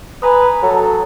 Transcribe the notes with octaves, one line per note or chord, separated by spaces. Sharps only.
B4 G#5 A#5 D#6
F#3 A4